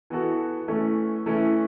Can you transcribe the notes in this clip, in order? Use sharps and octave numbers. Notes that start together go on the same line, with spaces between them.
E3 B3 F#4 A4
E3 A3 C#4
E3 A3 C#4 E4